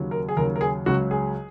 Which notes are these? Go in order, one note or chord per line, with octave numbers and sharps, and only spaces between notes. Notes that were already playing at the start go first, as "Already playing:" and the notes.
Already playing: D#2 C#3 F#3
A#4
G#4
D#2 C#3 F#3 A#4
A#4
G#4
C#2 C#3 F#3 F#4
G#4